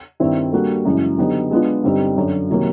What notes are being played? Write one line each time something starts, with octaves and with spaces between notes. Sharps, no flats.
G2 D#3 G3 C4 E4
G3 A#3 D4 F#4 A4
F#2 C#3 E3 G#3
D3 F#3 B3 D#4 G4
G#3 B3 D4 F4
G2 D3 G3 C4 D#4
F#2 D3 F#3
C3 D#3 F#3 A#3